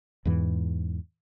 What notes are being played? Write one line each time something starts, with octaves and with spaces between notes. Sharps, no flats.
E2 G#2 E3